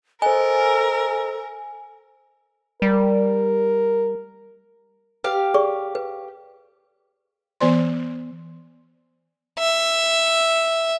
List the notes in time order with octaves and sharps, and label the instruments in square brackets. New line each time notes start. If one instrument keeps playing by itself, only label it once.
[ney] A4 [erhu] A#4 [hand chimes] C5 D#5 [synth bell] G#5
[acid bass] G3 [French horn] A#4
[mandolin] G4 F5 [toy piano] B4
[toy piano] G#4 D5 C#6
B4
[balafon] E3 B3 C5 D5 C6
[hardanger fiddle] E5